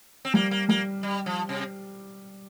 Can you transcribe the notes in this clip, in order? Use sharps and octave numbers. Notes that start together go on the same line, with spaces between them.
C4
G3 A#3
A#3
G3 A#3
G3
F3
C3